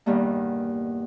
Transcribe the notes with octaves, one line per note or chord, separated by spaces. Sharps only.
E2 G2 B2 D#3 G3 A#3